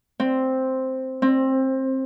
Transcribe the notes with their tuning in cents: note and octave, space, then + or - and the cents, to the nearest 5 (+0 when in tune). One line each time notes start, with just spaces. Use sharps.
C4 +0
C4 +20